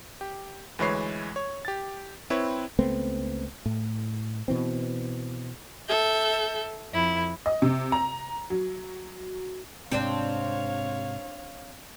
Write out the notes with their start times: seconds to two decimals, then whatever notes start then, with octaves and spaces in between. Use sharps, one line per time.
0.21 G4
0.79 D2 E3 G#3 B4 C#5 C7
1.36 C#5
1.65 G4 A6
2.30 C4 E4 B4 C#5
2.79 C#2 A3 B3 C4
3.66 A2
4.48 B2 E3 C4
5.88 A4 E5 G6
6.92 F2 E4
7.46 D#5
7.62 C3
7.92 A#5
8.50 F#3
9.91 G#2 C3 C4 D4 C5 C#5 F5